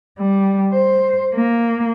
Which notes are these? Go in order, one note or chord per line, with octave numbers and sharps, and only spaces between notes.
G3
C5
A#3